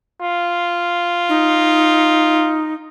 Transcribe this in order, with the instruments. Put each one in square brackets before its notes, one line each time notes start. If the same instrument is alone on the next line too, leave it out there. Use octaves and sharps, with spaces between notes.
[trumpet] F4
[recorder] D#4